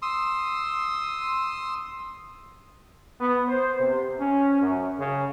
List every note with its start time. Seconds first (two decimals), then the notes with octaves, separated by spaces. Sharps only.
0.02 C6 D#6 E6
3.20 B3
3.48 C5
3.80 C3
4.19 C#4
4.61 F#2
4.99 C#3